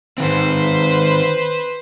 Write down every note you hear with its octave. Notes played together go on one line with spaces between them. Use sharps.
D#3 C4 B4 C5